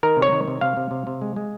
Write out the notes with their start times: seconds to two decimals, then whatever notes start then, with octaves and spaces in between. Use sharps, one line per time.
0.03 D#3 A#4
0.17 C3
0.22 C#5
0.32 D#3
0.48 C3
0.61 C3 F5
0.77 C3
0.91 C3
1.07 C3
1.22 G#3
1.36 G#3